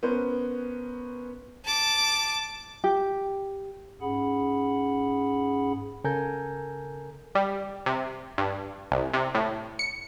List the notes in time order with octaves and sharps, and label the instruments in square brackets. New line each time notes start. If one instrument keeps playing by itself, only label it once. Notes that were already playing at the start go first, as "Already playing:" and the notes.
[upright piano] B3 C#4 A#4 C5
[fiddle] A5 D6
[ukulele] G4
[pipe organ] G#2 C#4 G#4 F#5 B5
[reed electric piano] C#3 A4 A#4 G#5 A#5 G6
[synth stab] G3
C3
G2
C2
C3
A2
C#7